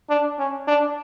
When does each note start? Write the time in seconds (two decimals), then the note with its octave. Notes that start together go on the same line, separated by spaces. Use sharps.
0.10 D4
0.39 C#4
0.68 D4